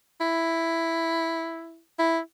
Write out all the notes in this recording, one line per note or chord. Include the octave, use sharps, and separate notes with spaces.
E4
E4